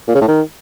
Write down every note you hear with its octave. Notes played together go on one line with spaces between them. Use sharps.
A#2
C#3
A2
D#3